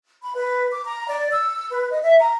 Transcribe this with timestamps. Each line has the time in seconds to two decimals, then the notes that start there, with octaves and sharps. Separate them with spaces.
0.22 B5
0.35 B4
0.71 D6
0.86 A#5
1.10 D5
1.31 E6
1.69 B4
1.91 D#5
2.02 E5
2.20 A#5